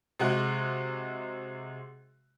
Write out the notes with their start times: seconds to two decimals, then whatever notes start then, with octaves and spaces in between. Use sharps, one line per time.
0.19 C3 G#3 F#4